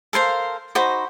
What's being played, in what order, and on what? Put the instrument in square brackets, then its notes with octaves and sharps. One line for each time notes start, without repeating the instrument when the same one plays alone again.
[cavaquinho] A4 A#4 C5 F5
D#4 F#4 C5 B5